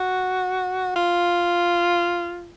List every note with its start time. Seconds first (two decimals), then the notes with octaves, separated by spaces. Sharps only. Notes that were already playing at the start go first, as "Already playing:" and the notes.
Already playing: F#4
0.96 F4